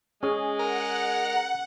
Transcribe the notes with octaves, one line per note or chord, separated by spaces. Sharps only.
G#3 C#4 G#4
A#4 F#5